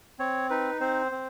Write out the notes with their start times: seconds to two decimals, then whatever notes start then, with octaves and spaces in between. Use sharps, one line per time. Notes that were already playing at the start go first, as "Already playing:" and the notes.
0.19 C4 C#5
0.50 D#4 B4
0.80 C4 C5
1.12 C4